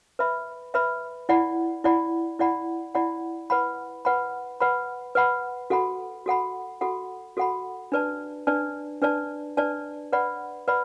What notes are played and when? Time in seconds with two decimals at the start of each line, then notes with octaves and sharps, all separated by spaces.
0.19 B4 E5 B5
0.74 B4 E5 B5
1.29 E4 D5 F#5 B5
1.84 E4 D5 F#5 B5
2.39 E4 D5 F#5 B5
2.95 E4 D5 F#5 B5
3.50 B4 F#5 B5
4.05 B4 F#5 B5
4.60 B4 F#5 B5
5.15 B4 F#5 B5
5.70 F#4 A4 F#5 B5
6.26 F#4 A4 F#5 B5
6.81 F#4 A4 F#5 B5
7.37 F#4 A4 F#5 B5
7.92 D4 B4 D5 A5
8.47 D4 B4 D5 A5
9.02 D4 B4 D5 A5
9.57 D4 B4 D5 A5
10.13 B4 D5 F#5 B5
10.68 B4 D5 F#5 B5